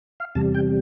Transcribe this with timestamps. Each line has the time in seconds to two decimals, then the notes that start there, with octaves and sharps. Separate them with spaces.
0.20 F5
0.35 E2 C3 G3 A5
0.55 G5